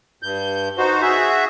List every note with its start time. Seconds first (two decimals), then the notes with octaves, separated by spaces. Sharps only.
0.23 G2 G6
0.78 D#4 F#4 C5
1.02 F#4 G#4 E5